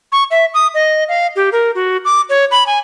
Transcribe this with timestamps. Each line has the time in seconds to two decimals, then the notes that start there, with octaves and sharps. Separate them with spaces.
0.12 C#6
0.31 E5
0.54 D#6
0.74 D#5
1.09 F5
1.36 G4
1.52 A#4
1.75 F#4
2.05 D6
2.29 C#5
2.51 B5
2.67 G#5